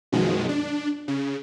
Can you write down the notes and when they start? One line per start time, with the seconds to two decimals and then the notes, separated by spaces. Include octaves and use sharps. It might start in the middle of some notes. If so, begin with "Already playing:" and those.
0.12 F#2 B2 D#3 F3 G#3
0.49 D4
1.08 C#3